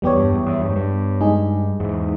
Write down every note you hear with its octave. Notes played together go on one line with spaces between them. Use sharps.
E2 G3 B3 G4 C#5
G2
E2
E2
G2
G#2
G2
G#3 D#4 G#4
E2 G#2